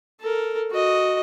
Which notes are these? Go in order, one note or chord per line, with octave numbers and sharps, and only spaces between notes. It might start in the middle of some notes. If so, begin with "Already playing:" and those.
A4 A#4
F#4 D#5